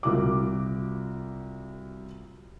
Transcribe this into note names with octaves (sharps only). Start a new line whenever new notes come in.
C2 F4 F#4 D6